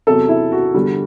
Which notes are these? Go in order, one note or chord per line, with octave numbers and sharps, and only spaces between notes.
E2 C3 F#3 A4
E4
F#4
E2 D3 G3